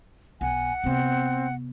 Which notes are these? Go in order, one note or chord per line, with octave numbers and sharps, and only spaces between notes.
B1 F#5 G#5
C3 B3 C4